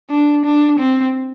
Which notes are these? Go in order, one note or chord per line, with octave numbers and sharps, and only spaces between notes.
D4
D4
C4